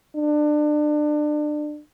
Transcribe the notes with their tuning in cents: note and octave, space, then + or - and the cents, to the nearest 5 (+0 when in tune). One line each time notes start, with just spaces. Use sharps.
D4 +30